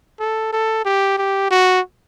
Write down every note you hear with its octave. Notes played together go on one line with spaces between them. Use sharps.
A4
A4
G4
G4
F#4